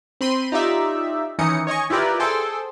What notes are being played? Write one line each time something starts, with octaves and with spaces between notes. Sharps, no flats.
C4 B5 C6 D#7
D#4 F4 G4 D5 E5
D#3 E3 C#4 D#4 D#6 C#7
C#5 D#5 G#5 C#6
E4 F4 G4 A#4 B4 D5
G#4 A4 C5 G5 C6